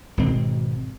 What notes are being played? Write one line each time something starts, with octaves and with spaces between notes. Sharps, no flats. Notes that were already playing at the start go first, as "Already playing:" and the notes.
G#1 B2 G#3 C4